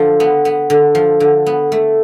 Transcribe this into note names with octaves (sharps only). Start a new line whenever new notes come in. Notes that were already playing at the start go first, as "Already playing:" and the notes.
Already playing: D3 F3
B3
B3
D3
F3
D3
B3
A3